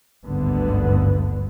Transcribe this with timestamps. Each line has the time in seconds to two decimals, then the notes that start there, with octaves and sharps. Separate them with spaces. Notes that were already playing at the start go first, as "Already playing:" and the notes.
0.25 G#1 D2 G2 D3 B3